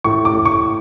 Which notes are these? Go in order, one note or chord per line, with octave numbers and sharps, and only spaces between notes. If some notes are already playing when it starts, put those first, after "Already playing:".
A2 C#6
D6
A2
C#6